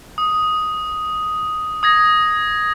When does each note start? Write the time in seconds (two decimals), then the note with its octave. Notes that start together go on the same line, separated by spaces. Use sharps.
0.18 D#6
1.83 D#6 G#6 A#6